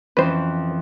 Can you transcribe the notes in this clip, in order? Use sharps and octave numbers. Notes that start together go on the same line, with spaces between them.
F2 E3 C#4 B4 C5